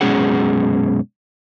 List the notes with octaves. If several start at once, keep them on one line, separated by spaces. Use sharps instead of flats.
F#2 B2 G#3 C#4 G#4 F#5